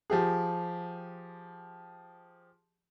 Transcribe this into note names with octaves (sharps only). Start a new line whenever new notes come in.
F3 G4 G#4